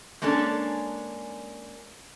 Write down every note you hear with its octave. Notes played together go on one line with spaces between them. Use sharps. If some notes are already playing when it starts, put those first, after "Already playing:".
G#3 A#3 C#4 D4 A4